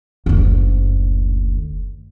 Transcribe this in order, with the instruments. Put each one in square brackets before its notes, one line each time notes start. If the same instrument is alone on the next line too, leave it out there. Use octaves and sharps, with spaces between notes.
[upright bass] F#1 D2